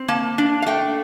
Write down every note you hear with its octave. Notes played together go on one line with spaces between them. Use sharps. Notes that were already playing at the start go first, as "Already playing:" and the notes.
Already playing: C4
A#3 A5
D4
F5
A3 G5